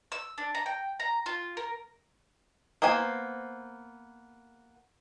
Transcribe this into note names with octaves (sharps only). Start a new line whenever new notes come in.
E6
D4
A#5
G5
A#5
F4
A#4
A#3 B3 C5 G#5